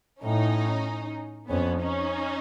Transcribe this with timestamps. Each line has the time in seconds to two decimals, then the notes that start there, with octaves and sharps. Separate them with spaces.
0.22 A2 C#4 D#4
1.49 F2 B3 C#4
1.81 C#4 D#4